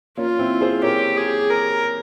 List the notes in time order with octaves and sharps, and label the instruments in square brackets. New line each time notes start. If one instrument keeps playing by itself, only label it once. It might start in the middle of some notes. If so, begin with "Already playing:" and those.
[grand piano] A#3 C#4 [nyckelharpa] F4
[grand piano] C4 E4
G#4 C5
[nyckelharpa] G4 [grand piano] A#4 C#5
[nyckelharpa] G#4
A#4